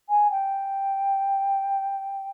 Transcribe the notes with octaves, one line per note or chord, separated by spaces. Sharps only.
G#5
G5